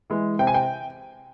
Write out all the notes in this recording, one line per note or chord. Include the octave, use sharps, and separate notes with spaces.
E3 G#3
C3 G5
G#5
G5